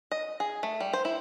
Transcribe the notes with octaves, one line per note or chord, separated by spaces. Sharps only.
D#5
G#4
A3
G3
C5
E4